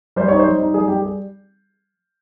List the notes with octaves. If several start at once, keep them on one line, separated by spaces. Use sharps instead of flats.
G3 C5
D#4 C#5
C5
G3
D#4
G3 G#4
G3 G4
G#4